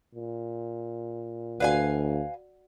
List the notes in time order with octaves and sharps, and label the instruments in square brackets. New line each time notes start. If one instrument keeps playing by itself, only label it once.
[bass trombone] A#2
[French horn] D2 [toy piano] F#4 D5 F#5 [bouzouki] B4 F5 G#5